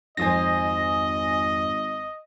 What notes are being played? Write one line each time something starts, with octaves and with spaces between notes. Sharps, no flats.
G#1 F2 F4 C5 D#5 G#5 D#6 A#6